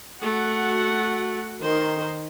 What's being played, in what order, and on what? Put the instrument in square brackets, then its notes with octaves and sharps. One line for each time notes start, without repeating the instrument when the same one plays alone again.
[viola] A3 [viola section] F#4 F#5
[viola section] D#3 [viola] C5